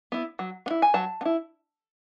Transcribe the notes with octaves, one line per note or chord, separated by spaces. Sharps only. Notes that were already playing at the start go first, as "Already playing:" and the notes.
B3 E4
F#3
B3
E4
G#5
F#3 A5
B3
E4